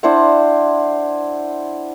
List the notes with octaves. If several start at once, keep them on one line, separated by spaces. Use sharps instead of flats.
D4 E4 C5 F#5